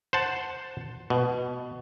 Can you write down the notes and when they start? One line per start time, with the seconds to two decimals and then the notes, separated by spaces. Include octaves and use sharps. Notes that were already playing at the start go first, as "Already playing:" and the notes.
0.13 C5 F#5 A5
1.10 B2